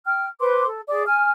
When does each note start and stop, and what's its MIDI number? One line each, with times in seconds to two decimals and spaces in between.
0.06 0.27 79
0.06 0.27 89
0.40 0.66 71
0.40 0.66 72
0.40 0.66 84
0.40 0.66 86
0.67 0.81 69
0.88 1.04 68
0.88 1.04 74
0.88 1.04 86
1.07 1.31 80
1.07 1.31 89